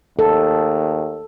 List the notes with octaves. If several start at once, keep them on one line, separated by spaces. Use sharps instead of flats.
D#2 A4